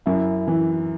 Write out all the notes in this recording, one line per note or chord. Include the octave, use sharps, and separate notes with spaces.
F#2 E4
E3